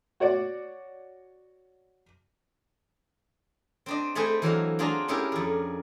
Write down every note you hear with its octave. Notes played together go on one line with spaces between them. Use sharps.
F#4 C#5 D5
C4 D4 D#5
A3 C4 G#4 B4 C5 G#5
E3 F#3 G#3 F5
D4 F4 F#4 G#4 A#5
C#4 D4 E4 G4 G#4 A#4
F2 G#4